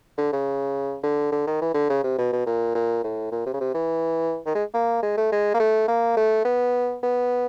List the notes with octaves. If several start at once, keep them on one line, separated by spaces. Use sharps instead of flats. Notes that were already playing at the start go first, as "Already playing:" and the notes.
D3
C#3
D3
D3
D#3
E3
D3
C#3
C3
B2
B2
A#2
A#2
A2
A#2
C3
C#3
C3
E3
D#3
G#3
A#3
G#3
A3
G#3
A#3
A3
A#3
A3
B3
B3